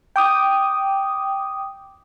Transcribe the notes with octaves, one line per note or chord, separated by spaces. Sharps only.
G5 D6 D#6